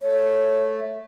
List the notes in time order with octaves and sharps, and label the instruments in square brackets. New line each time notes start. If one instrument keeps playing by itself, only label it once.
[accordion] A3 [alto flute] C#5